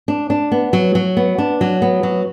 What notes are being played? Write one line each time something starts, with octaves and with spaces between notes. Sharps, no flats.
D4
D4
B3
F#3
F#3
B3
D4
F#3
B3
F#3